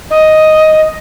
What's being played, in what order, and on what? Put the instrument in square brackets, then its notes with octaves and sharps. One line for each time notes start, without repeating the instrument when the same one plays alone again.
[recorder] D#5